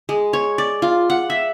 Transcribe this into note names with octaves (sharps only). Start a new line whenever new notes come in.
G#3
C#5
D5
F4
F#5
E5